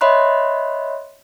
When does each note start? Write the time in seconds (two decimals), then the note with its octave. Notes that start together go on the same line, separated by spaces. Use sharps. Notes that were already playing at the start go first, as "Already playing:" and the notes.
0.01 C#5 D#5 E5 B5 C6 F#6